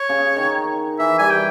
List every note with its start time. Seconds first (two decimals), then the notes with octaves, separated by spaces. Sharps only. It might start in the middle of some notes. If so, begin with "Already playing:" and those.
Already playing: C#5
0.09 C#3
0.36 D#3
0.99 E3 E5
1.19 G3 G#5
1.30 G5